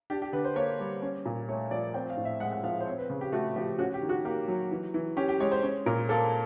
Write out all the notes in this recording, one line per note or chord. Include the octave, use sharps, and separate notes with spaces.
D4 G4
G4
D3 B4
C5
A#3 C#5
G3
C#4
A#2
A3 C#5
F3 D5
C4 G5
F5
A2
E5
G#3 F#5
F#5
F3 F5
C5
C4 C#5
B4
C#3
G4
A3 F#4
F3 G4
C#4 F#4
G4
D#3
F#4
A#3 G4
F#3
E3
E3
C#4 G4
G4
G#3 C#5
C5
C#4
A#2 A#4
A#3 A4